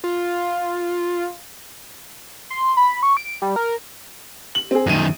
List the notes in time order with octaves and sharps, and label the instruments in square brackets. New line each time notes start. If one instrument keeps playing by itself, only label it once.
[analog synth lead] F4
C6
B5
C#6
D7
G3
A#4
[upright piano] F#7
C4 G#4
[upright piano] A#1 D#7 [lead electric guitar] F#2 D#3